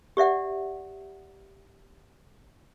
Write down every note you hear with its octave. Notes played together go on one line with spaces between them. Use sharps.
G4 D5 E5 F#5